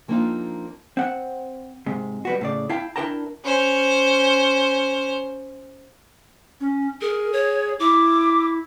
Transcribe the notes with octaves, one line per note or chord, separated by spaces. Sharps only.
F3 A#3 C4 D4 D#4 F4
C4 F#5
G#2 C3
G3 B3 F#4
A2 C#3 D5
E4 F5 G5 A5
D4 E4 A#4 G5 A5 A#5
C#4 C5
C#4
G#4 A#4
C#5
E4 D6